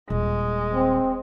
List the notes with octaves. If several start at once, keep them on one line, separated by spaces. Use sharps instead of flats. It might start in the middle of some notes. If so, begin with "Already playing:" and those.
D#1 G#3
C4